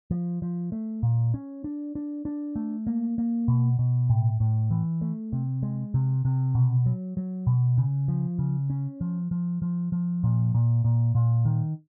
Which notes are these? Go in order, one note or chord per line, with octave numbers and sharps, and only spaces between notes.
F3
F3
A3
A#2
C#4
D4
D4
D4
A3
A#3
A#3
B2
B2
A2
A2
E3
A3
C3
G#3
C3
C3
B2
F#3
F#3
B2
C#3
F3
C#3
C#4
F3
F3
F3
F3
A#2
A#2
A#2
A#2
D#3